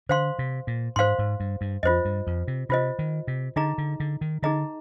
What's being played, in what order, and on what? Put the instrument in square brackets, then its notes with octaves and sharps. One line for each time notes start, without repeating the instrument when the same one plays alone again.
[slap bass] D3 [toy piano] C5 F5 C6
[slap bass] C3
A#2
[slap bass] G#2 [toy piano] C5 F5 C6
[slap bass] G#2
G2
G2
[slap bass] F2 [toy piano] F4 C5 D#5
[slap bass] G2
F2
C3
[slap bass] C3 [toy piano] F4 C5 D#5
[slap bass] D#3
C3
[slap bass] D3 [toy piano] D#4 G#4 D#5 A#5
[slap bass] D3
D3
D#3
[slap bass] D3 [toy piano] D#4 G#4 D#5 A#5